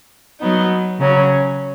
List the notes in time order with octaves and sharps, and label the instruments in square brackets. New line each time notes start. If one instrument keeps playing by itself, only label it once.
[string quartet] F#3 B3 D#4
C#3 F#3 C#4